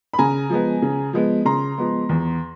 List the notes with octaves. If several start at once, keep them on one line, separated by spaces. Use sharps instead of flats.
B5
C#3 G#5 A#5
F3 G#3 B3
C#3
F3 G#3 B3
C#3 A#5 C6
F3 G#3 B3
E2